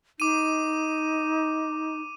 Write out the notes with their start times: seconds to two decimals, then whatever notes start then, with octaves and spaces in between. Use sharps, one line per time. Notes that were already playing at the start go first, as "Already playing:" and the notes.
0.20 D#4 D6 D#7